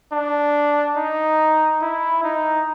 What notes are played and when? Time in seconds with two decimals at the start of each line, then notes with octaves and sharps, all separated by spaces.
0.13 D4
0.97 D#4
1.82 E4
2.24 D#4